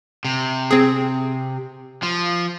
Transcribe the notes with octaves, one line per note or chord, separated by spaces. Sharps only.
C3
C4 G#4
F3